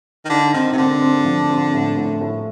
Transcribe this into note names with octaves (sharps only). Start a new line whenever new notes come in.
D#3
D3 D#4
D#3 C4
C3
D3 C4
C4
F3
C4
A2
A2
A2